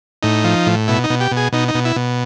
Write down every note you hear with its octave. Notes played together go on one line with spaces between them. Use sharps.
A2 D#4
F3
A2
B2 E4
D#4
B2
G4
B2
G#4
B2 D#4
D#4
B2
E4
B2